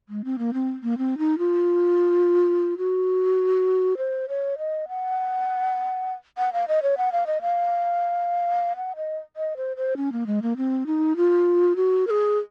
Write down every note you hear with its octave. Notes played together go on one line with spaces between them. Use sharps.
G#3
C4
A#3
C4
A#3
C4
D#4
F4
F#4
C5
C#5
D#5
F#5
F#5
F5
D#5
C#5
F#5
F5
D#5
F5
F#5
D#5
D#5
C5
C5
C#4
A#3
G#3
A#3
C4
D#4
F4
F#4
A#4
G#4